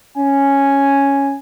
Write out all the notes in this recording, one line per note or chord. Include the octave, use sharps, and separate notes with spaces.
C#4 G#5